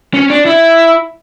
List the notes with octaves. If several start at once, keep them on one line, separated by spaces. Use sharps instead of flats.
C#4
D4
E4